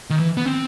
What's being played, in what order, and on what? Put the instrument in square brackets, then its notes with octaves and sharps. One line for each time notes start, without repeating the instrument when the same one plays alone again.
[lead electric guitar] D#3
E3
B3
C4